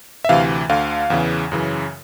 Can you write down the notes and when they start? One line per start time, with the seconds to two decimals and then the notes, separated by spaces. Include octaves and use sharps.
0.25 E5
0.29 D2 C3 E3 F5
0.69 D2 D3 F5
1.10 E2 C#3 E3
1.52 F#2 C#3 E3